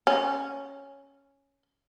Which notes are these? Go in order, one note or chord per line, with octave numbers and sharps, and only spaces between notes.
C#4